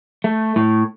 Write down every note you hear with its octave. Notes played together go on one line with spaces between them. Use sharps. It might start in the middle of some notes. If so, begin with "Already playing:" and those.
A3
A2